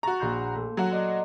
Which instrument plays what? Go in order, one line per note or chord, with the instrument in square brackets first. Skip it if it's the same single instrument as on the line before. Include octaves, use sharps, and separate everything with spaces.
[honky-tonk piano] F#4 A#5 [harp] C#6 A6
[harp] A#1 C6 G6
A3
[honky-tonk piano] F#3 F#4
[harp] D5 D#5 C6